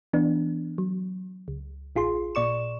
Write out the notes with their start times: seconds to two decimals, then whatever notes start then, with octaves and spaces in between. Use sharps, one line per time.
0.13 E3 B3 D4
0.78 F#3
1.48 C#2
1.96 A1 F4 G#4 C6
2.35 A#2 D5 C#6 E7